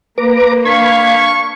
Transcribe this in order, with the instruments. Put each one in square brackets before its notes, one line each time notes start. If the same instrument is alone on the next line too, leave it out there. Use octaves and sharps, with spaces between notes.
[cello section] A#3 [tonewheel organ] B4 A#5 D6
[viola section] D4 F5 [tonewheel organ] B5 G#6 [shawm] C#6